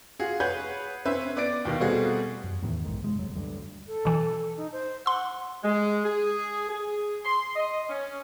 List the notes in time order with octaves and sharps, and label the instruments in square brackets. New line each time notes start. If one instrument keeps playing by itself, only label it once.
[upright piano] F4 F#4 G#4
G#4 B4 C#5 F#5 F#6 G6
C4 C#4 B4 E5
B3 D5 D6 A6 D7
D#2 B2 D#3 F5
B2 G3 A3 C4 F#4 G#4
[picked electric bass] F#2
E2 A2 D#3 E3
B1 G#2 D#3
F1 G#3
F1 F#3
D2 G2
[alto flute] A4
[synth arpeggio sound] B2 E3
[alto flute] D#4
C5
[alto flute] F#5 [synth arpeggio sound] C6 E6
[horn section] G#3
G#4
G#4
C6
D#5
C#4